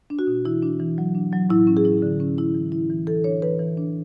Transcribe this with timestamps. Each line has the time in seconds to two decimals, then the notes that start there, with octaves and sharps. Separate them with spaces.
0.10 D4
0.19 F#4
0.27 B2
0.45 E3 E4
0.63 D4
0.80 E3
0.98 F#3
1.15 D4
1.33 F#3
1.50 A2 E4
1.67 C#4
1.77 G#4
1.85 E4
2.02 D3
2.20 C#4
2.38 E4
2.54 E3
2.72 E4
2.90 E3
3.07 E3 A4
3.24 D4 C#5
3.42 E3 B4
3.59 E3
3.77 D4